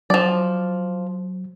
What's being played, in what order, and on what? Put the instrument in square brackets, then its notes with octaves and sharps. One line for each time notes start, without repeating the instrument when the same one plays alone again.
[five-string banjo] F3 D5 [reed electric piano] F#3